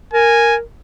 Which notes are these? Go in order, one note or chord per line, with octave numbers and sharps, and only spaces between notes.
A#4 G#5